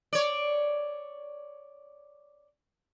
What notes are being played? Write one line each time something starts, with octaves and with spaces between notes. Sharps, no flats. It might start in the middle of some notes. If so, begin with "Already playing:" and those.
C#5 D5